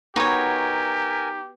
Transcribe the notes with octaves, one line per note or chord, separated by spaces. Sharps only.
B3 D#4 F#4 G4 A#4 C#5 G#5